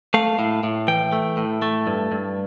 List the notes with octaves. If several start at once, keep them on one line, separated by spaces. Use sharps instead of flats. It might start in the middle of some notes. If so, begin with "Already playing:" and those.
A3 F5
A2
A2
E3 G5
A3
A2
A3
G2
G2